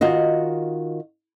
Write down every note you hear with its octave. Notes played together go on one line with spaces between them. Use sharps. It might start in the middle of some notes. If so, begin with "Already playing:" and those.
D#3 F4 F#4 D#5